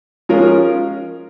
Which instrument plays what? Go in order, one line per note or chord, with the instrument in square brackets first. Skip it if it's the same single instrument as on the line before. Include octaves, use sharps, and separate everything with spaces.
[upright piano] F3 G#3 C#4 F4 A#4